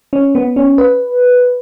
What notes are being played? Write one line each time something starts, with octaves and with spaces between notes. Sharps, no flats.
C#4
B3
C#4
B4